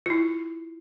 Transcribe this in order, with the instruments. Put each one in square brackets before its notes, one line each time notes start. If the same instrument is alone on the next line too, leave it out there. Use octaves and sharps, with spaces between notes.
[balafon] E4 F4